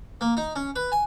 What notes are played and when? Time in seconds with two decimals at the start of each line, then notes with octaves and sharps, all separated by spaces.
0.21 A#3
0.37 D#4
0.56 C#4
0.76 B4
0.92 G#5